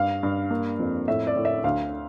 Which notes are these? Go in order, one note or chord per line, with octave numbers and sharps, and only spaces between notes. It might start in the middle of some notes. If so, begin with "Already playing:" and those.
Already playing: G2 F5
G2
A#3
F2
A2 E5
D5
A2
E5
D2 F5